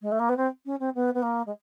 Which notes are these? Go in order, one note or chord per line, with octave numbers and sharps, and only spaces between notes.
G#3
A3
A#3
B3
C4
C#4
C4
B3
B3
A#3
G#3